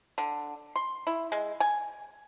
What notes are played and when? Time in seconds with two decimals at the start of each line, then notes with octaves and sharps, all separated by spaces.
0.18 D3
0.76 C6
1.07 E4
1.32 G#3
1.60 G#5